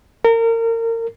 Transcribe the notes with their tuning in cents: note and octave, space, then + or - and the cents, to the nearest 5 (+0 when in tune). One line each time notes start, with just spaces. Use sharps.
A#4 -30